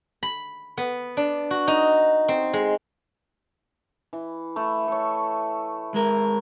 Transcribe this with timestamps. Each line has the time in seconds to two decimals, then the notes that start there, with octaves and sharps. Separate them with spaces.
0.23 B5
0.77 B3
1.17 D4
1.51 F#4
1.67 D#4
2.28 C4
2.53 G#3
4.13 E3
4.56 A3 E4
4.88 A4 C#5
5.94 G#3 A#4